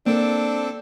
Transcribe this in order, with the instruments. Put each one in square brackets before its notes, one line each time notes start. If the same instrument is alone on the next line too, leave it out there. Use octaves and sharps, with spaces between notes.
[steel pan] A#3 [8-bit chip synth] C4 A4 [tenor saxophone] D4